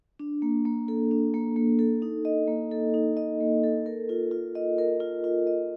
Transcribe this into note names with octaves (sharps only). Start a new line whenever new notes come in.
D4
A#3
A#3
A4
D4
A#3
A#3
A4
D#4
D#5
A#3
A4
D#4
D#5
A#3
A4
A#4
F4
F4
D#5
A#4
F4
F4
D#5